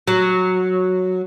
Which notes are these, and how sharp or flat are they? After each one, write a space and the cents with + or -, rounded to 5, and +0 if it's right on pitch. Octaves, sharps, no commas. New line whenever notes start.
F#3 -5